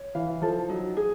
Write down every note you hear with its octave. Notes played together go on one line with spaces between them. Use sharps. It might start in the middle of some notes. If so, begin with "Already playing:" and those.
Already playing: C#5
E3 F5
F3 A4
F#3 D#4
G#4